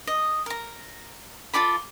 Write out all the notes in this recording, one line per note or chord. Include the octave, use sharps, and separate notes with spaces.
D#5
A#4 A#5
F4 A4 D5 B5